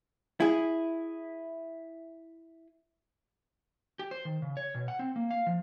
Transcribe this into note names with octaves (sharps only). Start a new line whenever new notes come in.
E4 G#4
G4
C5
D#3
C#3
C#5
B2
F#5
C4
A#3
F5
F3